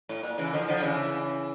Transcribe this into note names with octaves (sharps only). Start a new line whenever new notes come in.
A2
A#2
C#3 E3
D3 F3
D3 F3
C#3 E3